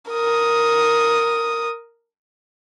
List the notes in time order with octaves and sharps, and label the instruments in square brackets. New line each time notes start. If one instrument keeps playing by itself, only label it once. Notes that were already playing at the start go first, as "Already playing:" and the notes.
[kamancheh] A#4 D#6